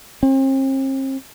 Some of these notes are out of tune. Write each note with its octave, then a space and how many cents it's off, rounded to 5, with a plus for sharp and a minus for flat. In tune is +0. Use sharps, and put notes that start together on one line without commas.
C4 +40